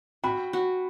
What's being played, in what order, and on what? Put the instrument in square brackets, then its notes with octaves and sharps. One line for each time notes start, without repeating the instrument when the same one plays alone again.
[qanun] F#4 [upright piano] G5 B5
[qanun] F#4